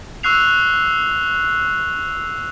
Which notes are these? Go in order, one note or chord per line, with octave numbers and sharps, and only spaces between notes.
C#6 E6 F#6 C7 F7